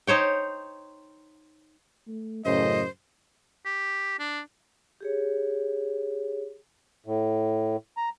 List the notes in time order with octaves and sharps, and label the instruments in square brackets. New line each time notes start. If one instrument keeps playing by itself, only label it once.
[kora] D#4 C5 C#5 G5
[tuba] A3
[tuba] F#2 [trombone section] A2 C#3 [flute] C5 [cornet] D#5
[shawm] G4
D4
[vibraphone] G4 G#4 C#5
[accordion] A2
A#5